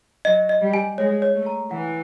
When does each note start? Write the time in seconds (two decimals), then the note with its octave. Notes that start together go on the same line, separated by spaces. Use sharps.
0.25 F#3 D#5
0.49 D#5
0.61 G3
0.74 G#5
0.98 G#3 C#5
1.22 C#5
1.35 A3
1.46 A#5
1.71 E3 F#5